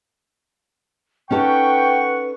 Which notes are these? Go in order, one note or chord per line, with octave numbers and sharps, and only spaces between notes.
C#4 D#4 A4 B4 F#5 G5 C#6